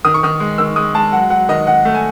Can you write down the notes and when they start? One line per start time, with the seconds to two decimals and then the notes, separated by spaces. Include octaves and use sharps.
0.05 D#3 D#6
0.14 C#6
0.23 D#3 D#6
0.40 G#3
0.58 D#3 E6
0.76 G#3 D#6
0.95 G#3 A5
1.12 F#3 F#5
1.30 F#3 F#5
1.49 D#3 D#5
1.67 D#3 F#5
1.85 A3
1.95 G#5